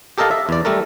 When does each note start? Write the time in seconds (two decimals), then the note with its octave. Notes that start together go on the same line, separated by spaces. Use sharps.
0.18 G4 A4 A#4 D#5 F5 A5
0.31 E5
0.49 E2 D5
0.65 G3 A3 A4 A#4